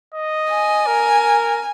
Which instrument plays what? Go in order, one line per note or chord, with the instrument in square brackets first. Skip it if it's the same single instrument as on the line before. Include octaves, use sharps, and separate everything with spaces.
[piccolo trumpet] D#5
[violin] G#5
[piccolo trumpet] A#4